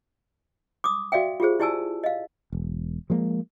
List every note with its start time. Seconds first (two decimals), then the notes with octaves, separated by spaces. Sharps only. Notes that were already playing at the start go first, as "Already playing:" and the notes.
0.84 D6 D#6
1.12 F#4 D5 E5 F5 G5
1.40 F4 G4 G#4 C5
1.60 E4 G4 D5 G#5 A5 E6
2.04 D#5 F5
2.52 E1
3.10 F3 G#3 A#3